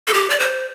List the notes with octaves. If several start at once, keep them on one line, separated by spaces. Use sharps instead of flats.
A4
G4
D5
C5